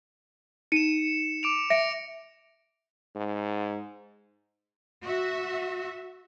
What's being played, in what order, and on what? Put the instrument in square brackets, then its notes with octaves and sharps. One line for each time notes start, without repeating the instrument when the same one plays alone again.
[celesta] D#4 D#7 [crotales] C#7 E7
[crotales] D6 D7 F7
[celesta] E5 [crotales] A#6 C#7 D7
[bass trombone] G#2
[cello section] F#4 E5